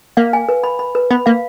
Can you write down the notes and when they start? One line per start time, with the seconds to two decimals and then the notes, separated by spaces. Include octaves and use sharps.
0.17 A#3 F5
0.33 G#5
0.49 B4
0.64 B5
0.79 B5
0.95 B4
1.10 B3 B5
1.26 A#3 F5